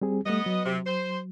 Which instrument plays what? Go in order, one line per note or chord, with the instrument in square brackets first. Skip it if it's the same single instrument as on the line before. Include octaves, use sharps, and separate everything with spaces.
[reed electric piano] G3 C4 G#4
[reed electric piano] G3 A3 [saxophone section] B3 D#5
[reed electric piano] F#3
[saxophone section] C3
C5